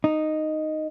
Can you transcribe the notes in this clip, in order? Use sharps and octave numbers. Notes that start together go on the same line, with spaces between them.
D#4